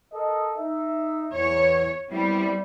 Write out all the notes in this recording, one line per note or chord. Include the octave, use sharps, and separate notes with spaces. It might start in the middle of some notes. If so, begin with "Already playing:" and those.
A4 A#4 D#5
D#4 E5
E2 C#5
G3 B3 C4 E4